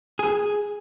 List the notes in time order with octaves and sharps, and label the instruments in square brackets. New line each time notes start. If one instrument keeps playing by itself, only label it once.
[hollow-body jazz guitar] G#4